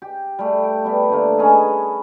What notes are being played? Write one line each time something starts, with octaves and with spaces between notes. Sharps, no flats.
G4
G3 A3
G5
G3 B3
D3 A3 A#3
C#4 G#4 B4 D#5